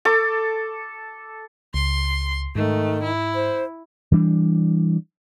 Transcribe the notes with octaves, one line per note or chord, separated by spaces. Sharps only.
A4 D6
C#2 C6
G#2 D#3 A3
E4
C5
E3 G3 D4